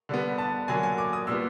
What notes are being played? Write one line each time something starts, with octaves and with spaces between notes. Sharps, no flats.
D3 G3 B3
A5
D3 F#3 A#3 G#5
G#5
D6
D#6
A#2 G3 B3 E6